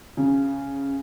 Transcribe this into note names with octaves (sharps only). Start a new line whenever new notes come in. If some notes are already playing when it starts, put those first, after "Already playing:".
C#3